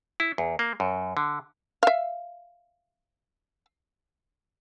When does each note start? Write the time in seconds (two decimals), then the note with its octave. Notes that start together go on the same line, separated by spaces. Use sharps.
0.20 E4
0.38 E2
0.59 A#3
0.80 F#2
1.17 D3
1.83 E5 F5